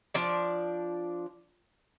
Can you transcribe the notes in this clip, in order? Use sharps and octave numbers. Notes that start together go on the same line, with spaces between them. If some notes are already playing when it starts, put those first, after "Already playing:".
F3 D4 D5